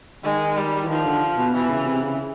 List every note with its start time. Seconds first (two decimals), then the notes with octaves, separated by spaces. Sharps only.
0.24 D#3 G#3
0.57 G3
0.84 E3
0.88 D#3 F3
1.05 D3
1.37 B2
1.53 B2 E3
1.70 C#3
1.86 C3
2.03 C#3